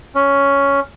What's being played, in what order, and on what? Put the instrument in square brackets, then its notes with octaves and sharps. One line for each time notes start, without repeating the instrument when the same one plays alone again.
[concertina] C#4